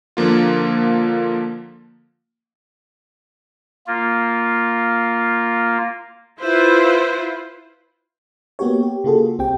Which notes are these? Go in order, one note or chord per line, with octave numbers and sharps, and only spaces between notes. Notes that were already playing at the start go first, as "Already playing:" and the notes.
D3 F3 A#3 F4
A#3 F4
E4 F4 B4 C5
A#3 B3 F#4 G4 C#5
G4
C#3 A#3 F4 F#4 G#4 A4
C2 C4 G4 G5